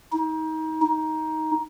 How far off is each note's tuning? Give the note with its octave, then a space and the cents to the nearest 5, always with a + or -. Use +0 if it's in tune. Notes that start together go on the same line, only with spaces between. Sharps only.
D#4 +30
D#4 +10